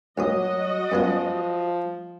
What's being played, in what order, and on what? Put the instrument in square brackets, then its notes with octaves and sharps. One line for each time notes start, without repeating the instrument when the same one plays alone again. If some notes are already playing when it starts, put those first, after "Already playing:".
[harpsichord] D2 A#2 D#6 [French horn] F#3 [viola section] F#4 D#5
[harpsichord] F#2 B3 F5 [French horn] F3